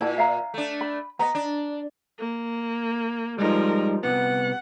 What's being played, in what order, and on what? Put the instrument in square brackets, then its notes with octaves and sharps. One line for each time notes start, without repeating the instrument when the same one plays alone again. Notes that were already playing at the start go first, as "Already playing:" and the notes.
[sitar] A#2 [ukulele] E4 A5
[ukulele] E5 F5 A#5
[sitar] A3 D4
[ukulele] B5
[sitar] B3 [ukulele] D#5 A#5
[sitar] D4
[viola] A#3
[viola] F3 A#4 [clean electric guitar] G3 G#3 D#4
[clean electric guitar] C2 C3 B3 [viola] F#5